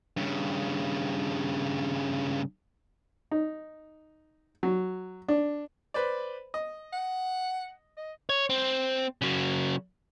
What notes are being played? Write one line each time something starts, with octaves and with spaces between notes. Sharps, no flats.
G2 C#3
D#4
F#3
D4
B4 C5 D5
D#5
F#5
D#5
C#5
C4
C#3 F#3